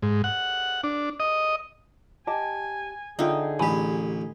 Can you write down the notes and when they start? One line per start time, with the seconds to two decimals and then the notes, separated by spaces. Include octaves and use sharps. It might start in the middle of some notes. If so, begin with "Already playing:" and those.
0.02 G#2
0.24 F#5
0.84 D4
1.20 D#5
2.27 G4 D#5 G#5 A5
3.19 D3 D#4 F4 G#4 E5 G5
3.60 A1 G4 G#5 B5